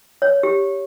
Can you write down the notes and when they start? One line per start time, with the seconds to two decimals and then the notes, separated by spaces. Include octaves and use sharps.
0.22 C#5
0.43 G4